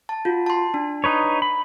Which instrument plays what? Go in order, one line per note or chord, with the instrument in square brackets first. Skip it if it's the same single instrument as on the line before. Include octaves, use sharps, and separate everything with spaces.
[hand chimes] A5
F4 F#4
A5 C6
D4
[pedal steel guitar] D#4 B4 C#5
B5